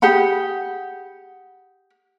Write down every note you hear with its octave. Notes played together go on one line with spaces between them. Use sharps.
G4 G#4 F#5 B5